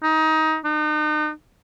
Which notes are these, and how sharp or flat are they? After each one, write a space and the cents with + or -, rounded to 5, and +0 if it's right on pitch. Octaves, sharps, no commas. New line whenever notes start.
D#4 +20
D#4 -40